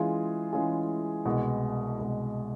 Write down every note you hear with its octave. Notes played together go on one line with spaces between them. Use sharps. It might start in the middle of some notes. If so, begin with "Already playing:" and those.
Already playing: E3 G#3 C#4 F4 G#4
E3 G#3 C#4 F4 G#4
C2 B2 G#3
C2 B2 G#3